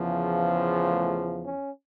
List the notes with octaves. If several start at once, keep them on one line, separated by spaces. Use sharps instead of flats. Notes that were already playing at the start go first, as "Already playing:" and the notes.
Already playing: E2 C#3 F3
A3
C#4